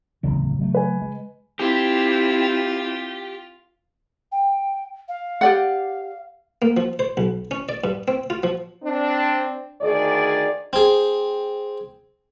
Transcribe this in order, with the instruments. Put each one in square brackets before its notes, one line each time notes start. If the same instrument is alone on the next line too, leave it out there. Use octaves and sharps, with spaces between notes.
[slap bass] D1 E2 F#3 [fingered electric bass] C#3 E3
[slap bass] F#3 G3 A3
[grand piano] B4 G#5
[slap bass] G#3
[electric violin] C4 E4 [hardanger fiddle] F4 [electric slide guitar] G4
[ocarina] G5
F5
[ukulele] G4 D5 F#5
[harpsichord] A#3
F3
C5
B1
C#4
D5
G2
C4
F4
F3
[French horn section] C4 D4
D2 D#3 G#4 D5
[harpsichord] C4 G#4